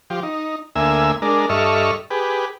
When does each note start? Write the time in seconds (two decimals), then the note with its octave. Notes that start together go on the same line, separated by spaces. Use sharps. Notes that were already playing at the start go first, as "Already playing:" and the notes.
0.10 F3 G4
0.23 D#4
0.76 D2 A#3 E5 G#5 E6
1.22 G#3 D4 A#4
1.49 G2 A4 D#5 E5 C#6 F6
2.11 G4 G#4 B4